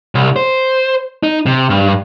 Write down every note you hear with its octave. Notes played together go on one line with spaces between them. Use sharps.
C2
C5
D#4
C3
G2